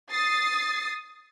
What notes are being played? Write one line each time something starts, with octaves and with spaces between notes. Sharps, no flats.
D#6 A6 C7